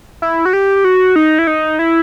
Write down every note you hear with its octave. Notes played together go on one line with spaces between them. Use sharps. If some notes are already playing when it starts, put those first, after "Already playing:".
E4
F#4
G4
G4
F#4
D#4
E4
D#4
E4